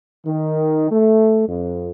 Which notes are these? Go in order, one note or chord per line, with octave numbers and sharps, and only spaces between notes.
D#3
A3
F2